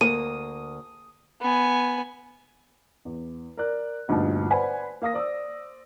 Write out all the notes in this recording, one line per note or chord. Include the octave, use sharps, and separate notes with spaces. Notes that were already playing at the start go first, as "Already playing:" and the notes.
D2 A#3 D#6 D#7
B3 G#5
E2
A#4 D5 F#6
G1 D2 G2 A#2 D#4 A5
B4 C5 D5 F#5 G#5 B5
A#3 F5 D#6 A#6
C5 D5 D#6 E6